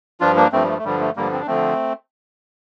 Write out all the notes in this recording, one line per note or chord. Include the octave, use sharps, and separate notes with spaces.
G2 F3 D4 F4
A#3 D4
G2 F3 A3 C4
G3
A3
A3
G2 D3 F3 G3
A3
G2 D3 F3 G3 A#3
C4
D4
D3 F3 A3 C4